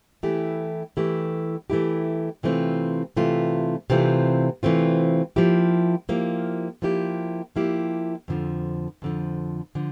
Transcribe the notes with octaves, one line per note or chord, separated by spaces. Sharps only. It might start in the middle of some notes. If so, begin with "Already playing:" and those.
E3 A3 E4 G4
E3 A3 E4 G4
E3 A3 E4 G4
C3 E3 A3 C4 F4
C3 E3 A3 C4 F4
C3 E3 A3 C4 F4
C3 E3 A3 C4 F4
F3 A#3 E4 G4
F3 A#3 E4 G4
F3 A#3 E4 G4
F3 A#3 E4 G4
F2 D3 F3
F2 D3 F3
D3 F3